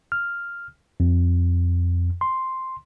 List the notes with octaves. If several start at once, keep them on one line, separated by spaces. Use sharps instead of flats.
F6
F2
C6